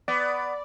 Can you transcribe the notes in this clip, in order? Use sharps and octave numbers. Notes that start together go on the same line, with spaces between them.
B3 D5